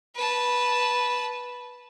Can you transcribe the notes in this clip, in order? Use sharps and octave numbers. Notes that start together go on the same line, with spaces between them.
B4 A5